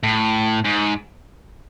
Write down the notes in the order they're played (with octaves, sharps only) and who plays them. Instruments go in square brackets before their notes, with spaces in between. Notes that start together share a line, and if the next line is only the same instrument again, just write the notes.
[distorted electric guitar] A2
G#2